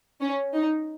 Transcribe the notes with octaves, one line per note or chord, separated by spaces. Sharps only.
C#4
D#4